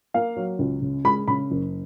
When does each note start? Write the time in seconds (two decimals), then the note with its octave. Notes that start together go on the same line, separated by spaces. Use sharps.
0.14 A#3 F5
0.37 F#3
0.59 C#2
0.82 C#3
1.05 G#3 B5
1.28 C#3 B5
1.51 F#1